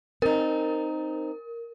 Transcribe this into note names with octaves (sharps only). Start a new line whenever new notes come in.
C4 D#4 A#4